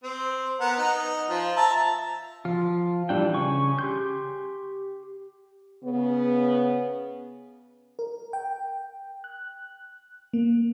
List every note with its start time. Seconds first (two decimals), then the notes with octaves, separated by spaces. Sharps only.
0.04 C4
0.61 B3 A#4 F#5
0.78 D#4
1.29 F3
1.57 E5 A5 A#5
2.45 F3 F4
3.09 E3 G3 D4 G5
3.33 C#3 G#5 C#6
3.79 G4 C6 G6
5.83 C#3 B3
7.99 A#4
8.33 G5
9.24 F#6
10.33 A#3